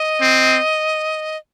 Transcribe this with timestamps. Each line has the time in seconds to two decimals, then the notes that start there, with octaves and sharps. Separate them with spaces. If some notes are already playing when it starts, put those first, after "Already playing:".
Already playing: D#5
0.21 C4